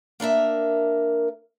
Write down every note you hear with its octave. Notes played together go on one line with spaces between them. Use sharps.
A#3 D4 A#4 E5